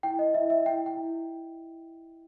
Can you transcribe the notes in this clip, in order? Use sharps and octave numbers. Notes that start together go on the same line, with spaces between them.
E4 G5
D#5
E4 E5
E5
E4 G5
G5
E4